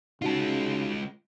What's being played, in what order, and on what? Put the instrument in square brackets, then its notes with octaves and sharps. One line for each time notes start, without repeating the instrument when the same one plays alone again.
[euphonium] C#3 [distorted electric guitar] G#3 F4 [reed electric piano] D#4 F#4 A5